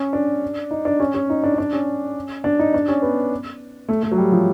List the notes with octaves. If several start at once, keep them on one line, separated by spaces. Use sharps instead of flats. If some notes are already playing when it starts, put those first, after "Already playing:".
Already playing: C#4
D4
D#4
D4
C#4
C#4
D#4
D4
D#4
D4
C#4
D4
D#4
D4
C#4
B3
A3
A3
F#3
G3
F3